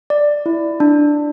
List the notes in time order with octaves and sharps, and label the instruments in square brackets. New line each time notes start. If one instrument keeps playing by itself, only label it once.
[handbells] D5
E4
D4